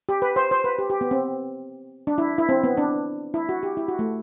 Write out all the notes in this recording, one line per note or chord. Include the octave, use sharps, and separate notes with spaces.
G4
B4
C5
C5
B4
G4
G4
B3
C4
D4
E4
E4
C4
B3
D4
E4
F#4
G4
E4
F#4
A3